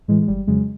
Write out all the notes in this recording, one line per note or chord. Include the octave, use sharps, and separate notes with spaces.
A2 E3 G#3
G#3
G1 G3
F2 C#3 F#3 G#3